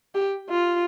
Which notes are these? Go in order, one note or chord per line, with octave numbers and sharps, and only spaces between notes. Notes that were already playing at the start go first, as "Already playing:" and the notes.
G4
F4